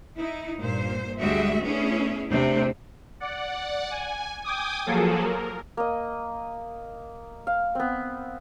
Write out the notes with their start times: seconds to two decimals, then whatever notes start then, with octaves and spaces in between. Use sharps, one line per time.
0.16 D#4 E4
0.59 G2 A#2 C5
1.20 D2 G3 G#3 F#4 G#4 E5
1.62 A3 B3 C#4 D4 E4 G#4
2.30 E2 C3 A3 C4 D4
3.20 D5 F#5
3.91 G#5
4.44 G5 G#5 D6 D#6
4.86 F3 F#3 A#3 G#4 A4
5.22 A#4
5.77 A#3 D#5
7.47 F5
7.75 B3 C4